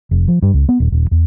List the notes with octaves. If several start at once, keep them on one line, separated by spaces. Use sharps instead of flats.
F1
F3
G2
C#2
B3
D#1
D#1
E2